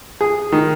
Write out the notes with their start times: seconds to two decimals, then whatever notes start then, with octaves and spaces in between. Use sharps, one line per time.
0.21 G#4
0.52 D#3